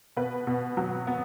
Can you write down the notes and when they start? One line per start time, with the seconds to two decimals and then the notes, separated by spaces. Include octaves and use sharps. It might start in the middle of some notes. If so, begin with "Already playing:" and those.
0.17 B2 B4
0.47 B2
0.77 F#3
1.07 B3